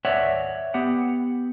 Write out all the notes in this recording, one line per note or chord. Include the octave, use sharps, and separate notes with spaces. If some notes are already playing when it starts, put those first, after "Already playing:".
C#5 D5 E5 F#5
B3 G4 F#5